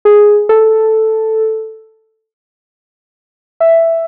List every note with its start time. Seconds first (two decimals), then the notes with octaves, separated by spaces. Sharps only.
0.05 G#4
0.49 A4
3.60 E5